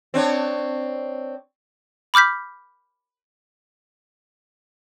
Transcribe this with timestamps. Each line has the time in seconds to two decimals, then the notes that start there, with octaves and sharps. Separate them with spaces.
0.14 C4 D4 C#5
2.14 B5 D6 F6 G6 B6